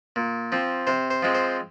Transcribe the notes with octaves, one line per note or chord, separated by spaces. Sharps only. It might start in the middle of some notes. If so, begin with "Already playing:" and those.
A#2
F3 C4
C3 C5
C5
F3 G#3 C4
C5